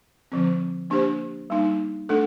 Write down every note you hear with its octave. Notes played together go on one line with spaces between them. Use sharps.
D3 F3 C4
A#3 D4 G4 C5
G3 A#3 D#4
A3 D4 A4